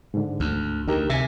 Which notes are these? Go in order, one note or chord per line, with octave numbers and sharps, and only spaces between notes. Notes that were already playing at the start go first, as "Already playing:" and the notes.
G#2 D3
D2
D2 D#4 G4 A#4
C3 E5 G#5